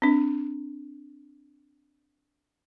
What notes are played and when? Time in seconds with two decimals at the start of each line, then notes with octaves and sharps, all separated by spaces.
0.02 C4 D4